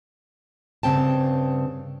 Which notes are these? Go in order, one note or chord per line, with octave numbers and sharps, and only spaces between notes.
G2 C#3 C4 G5 A5